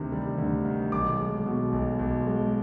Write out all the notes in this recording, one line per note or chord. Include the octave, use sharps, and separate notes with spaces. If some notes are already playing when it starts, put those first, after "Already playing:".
Already playing: D2 C3 D#3
G3
D2
D#3
B1 D6
G#3
B2
B1
B1
G#3